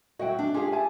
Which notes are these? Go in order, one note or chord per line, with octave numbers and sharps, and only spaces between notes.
F#3 F#4 D#5 E5 G5
D4
F4 G4 G#4 F5 G#5
E5 G#5 A5